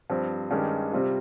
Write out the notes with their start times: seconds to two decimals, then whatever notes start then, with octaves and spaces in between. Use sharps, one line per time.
0.10 G2 F3 C4
0.51 G2 D#3 G#3 C#4 G4
0.92 C3 G3 C4 F4